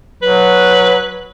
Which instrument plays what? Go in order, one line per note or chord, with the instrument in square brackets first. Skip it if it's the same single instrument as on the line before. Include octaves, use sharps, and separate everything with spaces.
[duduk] F#3 [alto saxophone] B4